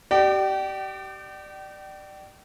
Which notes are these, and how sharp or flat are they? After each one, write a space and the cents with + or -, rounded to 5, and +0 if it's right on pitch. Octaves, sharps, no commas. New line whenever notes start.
G4 -30 D5 +25 G5 -40